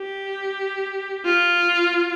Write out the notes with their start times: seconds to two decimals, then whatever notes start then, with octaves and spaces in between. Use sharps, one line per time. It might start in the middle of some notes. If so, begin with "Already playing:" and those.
Already playing: G4
1.25 F4